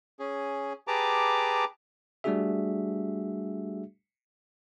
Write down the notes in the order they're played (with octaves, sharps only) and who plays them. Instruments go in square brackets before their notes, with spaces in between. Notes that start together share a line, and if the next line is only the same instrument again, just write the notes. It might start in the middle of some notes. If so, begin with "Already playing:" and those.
[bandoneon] C#4 G#4
G4 G#4 B4 A5 A#5 D6
[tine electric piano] G3 A3 D4 F#4 G#4 E5